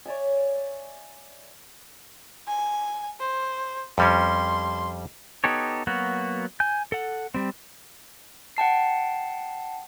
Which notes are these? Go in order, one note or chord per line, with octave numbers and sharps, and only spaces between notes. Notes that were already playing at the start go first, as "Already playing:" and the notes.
C#5 D5 E5 G#5
G#5
C5
F2 G3 C#4 C6
B3 D#4 G4 A4 C#5
F#3 A#3 B3 F#4
G#5 G6
A4 F#5
G3 C4
F#5 G5 A5 C7